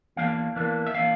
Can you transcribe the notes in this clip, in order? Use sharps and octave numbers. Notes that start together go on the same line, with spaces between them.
E2 E3 A#3 D4 F5
E2 E3 A#3 D4
E5
E3 A#3 D4 F5